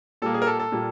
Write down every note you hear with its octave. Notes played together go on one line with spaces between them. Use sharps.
A#2 G3 A#3 A4
G#4
A#4
A4
A4
A#2 G3 A#3